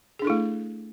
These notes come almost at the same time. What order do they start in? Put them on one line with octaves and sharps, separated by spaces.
G#4 D4 A4 E4 A3